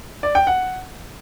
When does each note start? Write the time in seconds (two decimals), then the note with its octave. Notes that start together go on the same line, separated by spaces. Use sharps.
0.23 D5
0.35 G5
0.47 F#5